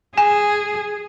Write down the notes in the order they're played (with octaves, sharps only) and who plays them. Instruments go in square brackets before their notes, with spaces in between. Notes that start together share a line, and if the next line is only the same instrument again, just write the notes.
[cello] G#4 [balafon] G#5